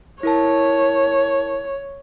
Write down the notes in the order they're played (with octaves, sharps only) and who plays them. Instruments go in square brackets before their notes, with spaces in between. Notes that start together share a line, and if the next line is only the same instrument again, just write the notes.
[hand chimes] E4 A#4 A5 [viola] C#5